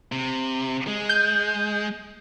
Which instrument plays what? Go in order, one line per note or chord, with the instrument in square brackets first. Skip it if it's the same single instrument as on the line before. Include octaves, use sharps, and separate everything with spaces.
[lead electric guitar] C3
G#3
[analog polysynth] G6